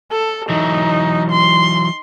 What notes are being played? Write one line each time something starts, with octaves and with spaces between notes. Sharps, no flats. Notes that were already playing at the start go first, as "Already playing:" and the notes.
A4
E3 F#3 D#4
C6